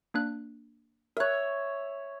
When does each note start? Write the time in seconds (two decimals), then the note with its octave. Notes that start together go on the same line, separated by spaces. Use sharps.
0.14 A#3 D4 F#6
1.17 A#4 C#5 E5 F#6